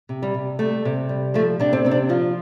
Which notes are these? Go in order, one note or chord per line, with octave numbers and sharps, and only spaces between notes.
C3
G3
C3
G3 A3
C3
G3
F3 A3
C3 D4
C4
C3 C4
D4
F3 F4